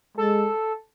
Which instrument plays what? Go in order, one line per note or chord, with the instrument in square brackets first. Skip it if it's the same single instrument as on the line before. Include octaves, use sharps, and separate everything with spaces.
[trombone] G#3 [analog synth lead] A4